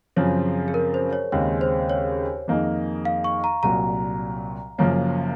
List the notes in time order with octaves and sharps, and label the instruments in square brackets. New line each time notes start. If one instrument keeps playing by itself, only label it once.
[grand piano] F#2 C#3 F3 C4 [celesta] C#5
[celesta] G#4
A#4
C5
C#5
[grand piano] D#2 C#3 G#3 C4 [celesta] C#5
[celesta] C5
C#5
[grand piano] F2 D#3 A#3 D#4 G#4
[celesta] F5
C#6
A#5
[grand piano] C2 A#2 F#3 [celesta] A#5
[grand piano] F#1 F#2 F3 A#3 C#4